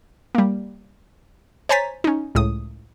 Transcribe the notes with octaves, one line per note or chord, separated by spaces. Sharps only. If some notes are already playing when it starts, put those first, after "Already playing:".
G3 A#3
C5 C#5 G#5 A#5 A6 B6
C#4 D#4
C#2 A2 D#6